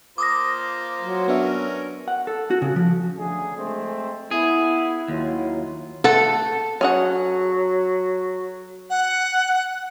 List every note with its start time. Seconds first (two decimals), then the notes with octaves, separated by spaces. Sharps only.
0.18 A#3 F4 C5 D6 D#6 A#6
1.01 F#3
1.28 B3 C#4 D4 A#4 E5
2.08 F#5
2.27 A4
2.50 F#4
2.62 C#3
2.76 F3
3.16 D2 C#3 G#4
3.57 G#3 A3 C4
4.31 B3 E4 G#4
5.08 D#2 F#3 E4 F4
6.04 A3 A4 F#5 A5
6.81 F#3 C#4 G#4 F#5
8.90 F#5